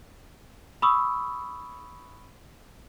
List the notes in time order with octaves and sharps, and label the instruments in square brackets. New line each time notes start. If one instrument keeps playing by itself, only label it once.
[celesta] B5 C#6 D#6 E6